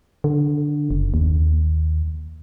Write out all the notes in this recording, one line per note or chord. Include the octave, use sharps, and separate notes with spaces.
D3
F#1
D#2